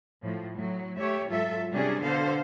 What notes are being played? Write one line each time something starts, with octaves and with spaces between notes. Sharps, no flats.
A2 F3
A2 F#3
A3 G4 C#5 E5
G#2 F#3 F4 A4 E5
C3 G3 C#4 D4 G#4
B2 D3 B3 A4 C5 F5